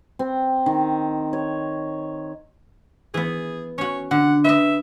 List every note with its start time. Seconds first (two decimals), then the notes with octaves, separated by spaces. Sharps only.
0.19 C4
0.66 D#3
1.33 C#5
3.14 E3 B3 G#4
3.78 C#4 F#4 C#5
4.11 D3 F#5
4.44 B4 D#5 E5